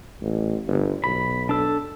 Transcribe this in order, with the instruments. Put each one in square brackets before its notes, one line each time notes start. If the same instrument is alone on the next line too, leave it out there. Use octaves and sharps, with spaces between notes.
[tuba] A1
G1
[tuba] B1 [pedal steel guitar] B5
[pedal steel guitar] D4 A4